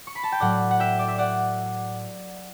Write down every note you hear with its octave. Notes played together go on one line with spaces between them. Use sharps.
C#6
B5
A5
G5
A2 F#3 D5 F#5
F#5
E5 G5
D5
E5
D5 F#5